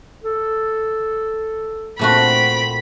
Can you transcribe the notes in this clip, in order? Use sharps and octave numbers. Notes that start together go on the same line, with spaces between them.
A4
A#2 A3 C4 F#4 B5